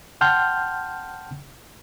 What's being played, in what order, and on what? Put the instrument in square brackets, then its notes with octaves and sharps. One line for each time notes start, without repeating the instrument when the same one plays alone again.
[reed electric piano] F#5 G5 A5 C6 F6 G6